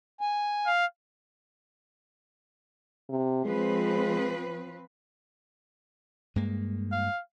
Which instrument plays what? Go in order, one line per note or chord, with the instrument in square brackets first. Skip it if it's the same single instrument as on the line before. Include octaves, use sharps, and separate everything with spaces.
[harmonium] G#5
[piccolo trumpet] F5
[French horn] C3
[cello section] F3 C4 B4 [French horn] G#3
[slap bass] G2 G#3 A#3
[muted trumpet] F5